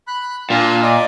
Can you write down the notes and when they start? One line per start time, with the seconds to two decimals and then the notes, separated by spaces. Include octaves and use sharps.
0.07 B5 F#6
0.50 A#2 D4 F4
0.83 D5 D#5